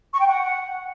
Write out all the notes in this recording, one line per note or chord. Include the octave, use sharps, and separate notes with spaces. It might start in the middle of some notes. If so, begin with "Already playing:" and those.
C#6
G5
F#5